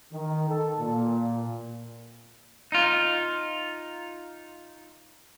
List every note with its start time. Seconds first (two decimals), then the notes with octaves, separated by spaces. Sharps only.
0.13 D#3
0.49 A4
0.79 A#2
2.72 D#4 F4